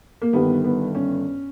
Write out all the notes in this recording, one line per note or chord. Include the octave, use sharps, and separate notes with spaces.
A#3
G1 G2 D#3 G3 B3
B3
C#4